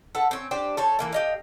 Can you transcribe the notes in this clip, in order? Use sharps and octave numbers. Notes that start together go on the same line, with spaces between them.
A4 B4 F#5
C4 C#4
D4 G4 C5
A4 C5 C#5
E3 A#3 E4
G4 D#5 F5